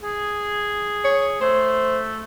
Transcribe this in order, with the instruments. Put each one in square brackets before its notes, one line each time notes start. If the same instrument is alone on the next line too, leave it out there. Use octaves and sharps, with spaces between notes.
[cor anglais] G#4
[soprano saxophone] C#5
[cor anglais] A3 [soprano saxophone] C5